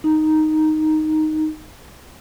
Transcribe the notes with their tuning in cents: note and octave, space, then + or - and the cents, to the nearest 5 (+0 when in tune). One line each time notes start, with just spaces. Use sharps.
D#4 +0